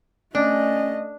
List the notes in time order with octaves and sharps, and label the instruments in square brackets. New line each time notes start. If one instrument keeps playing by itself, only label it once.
[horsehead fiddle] A3 D#5 [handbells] C#4 [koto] D4